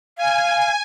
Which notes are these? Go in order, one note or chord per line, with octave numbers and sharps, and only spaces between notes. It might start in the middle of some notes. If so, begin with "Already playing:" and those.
F5 G#5